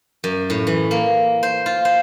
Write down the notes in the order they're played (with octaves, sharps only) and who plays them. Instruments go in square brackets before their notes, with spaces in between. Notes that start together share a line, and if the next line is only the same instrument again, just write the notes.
[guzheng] F#2
A2
E3
A#3
C5
F4
C5